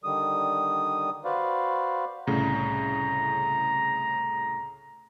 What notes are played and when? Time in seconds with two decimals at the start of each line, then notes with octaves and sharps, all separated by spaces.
0.04 D3 D#3 G3 D#6
1.25 F#4 B4 C5 D5 F5
2.27 C2 A2 C#3 A#5